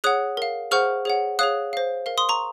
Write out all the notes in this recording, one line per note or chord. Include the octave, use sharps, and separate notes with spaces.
G#4 C#5 F#5 D#6 F#6
A#4 F5
G#4 C5 F#5 C#6 F6
G#4 C#5 F#5
G#4 C#5 F5 D#6 F#6
C5 F5
A#4 F5
C6 D#6
A#5 C#6